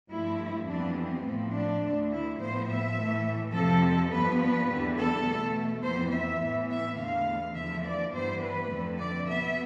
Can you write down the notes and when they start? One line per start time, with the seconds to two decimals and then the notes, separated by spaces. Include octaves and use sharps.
0.10 G2 F3 A3 E4
0.67 F2 E3 G3 B3 D4
0.96 C4
1.25 A2 F3 A3
1.54 D4
1.82 D2 D3 A3
2.11 E4
2.39 A2 F3 B3 C5
2.68 E5
2.96 A2 E3 A3
3.54 F2 C3 F3 A4
4.12 G2 F3 B3 B4
4.40 B4
4.69 E2 D3 G3
4.98 A4
5.27 B2 A3
5.83 F2 E3 B3 C5
6.12 E5
6.41 A2 E3 B3
6.70 E5
6.98 E2 D3 A3 F5
7.56 E2 D3 F3 A3 E5
7.85 D5
8.13 G2 E3 B3 C5
8.42 B4
8.70 F2 D3 A3
8.99 D5
9.28 B2 B3 E5